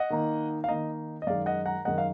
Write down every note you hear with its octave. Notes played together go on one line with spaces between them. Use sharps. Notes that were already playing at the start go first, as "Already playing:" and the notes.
Already playing: D#5 F#5
D#3 A#3 D#4
F5
D#3 A#3 D#4 D#5
D#5
F#2 D#3 G#3 D#4 D5 F5
D#5 F#5
F#5 A#5
F#2 D#3 G#3 D#4 D#5 F#5
F5